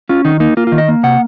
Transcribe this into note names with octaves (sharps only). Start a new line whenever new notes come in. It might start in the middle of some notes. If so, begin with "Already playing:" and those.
C#4 F4
D#3 D#4
A#3 D#4
A#3 F4
D#3 F4
D#5
A#3
C3 F#5